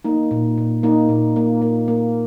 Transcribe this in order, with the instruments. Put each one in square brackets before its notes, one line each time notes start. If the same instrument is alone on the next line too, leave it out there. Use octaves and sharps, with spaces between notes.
[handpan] A#3 D#4
A#2
A#2
A#3 D#4
A#2
A#3
A#3
A#3